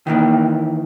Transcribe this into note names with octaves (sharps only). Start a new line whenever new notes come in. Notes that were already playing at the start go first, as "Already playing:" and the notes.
D#3 E3 A#3